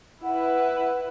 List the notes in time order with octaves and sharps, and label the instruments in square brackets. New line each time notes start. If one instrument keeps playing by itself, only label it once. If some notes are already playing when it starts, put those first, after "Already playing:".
[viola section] E4 B4 [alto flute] F#5